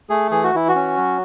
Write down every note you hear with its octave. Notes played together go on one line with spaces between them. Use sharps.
A3 G#4
E3 G#4
F#4
E3 E4
F#4
C#4
F#3